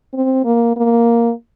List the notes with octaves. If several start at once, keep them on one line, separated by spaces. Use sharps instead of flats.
C4
A#3
A#3